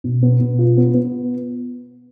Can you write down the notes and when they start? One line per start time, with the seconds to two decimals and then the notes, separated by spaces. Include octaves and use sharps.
0.04 B2
0.22 B3
0.40 B2
0.59 F4
0.77 B3
0.94 B3